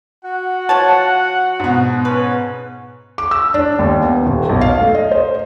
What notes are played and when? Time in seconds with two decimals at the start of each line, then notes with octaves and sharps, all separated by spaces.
0.24 F#4 F#5
0.69 F3 C#5 A5
1.60 G#2 B2
2.05 C#4 B4
3.18 D6
3.31 E6
3.54 D4
3.79 D#2
4.02 B3
4.26 D#1
4.49 B1
4.61 F5
4.79 A3
4.95 D#5
5.11 C5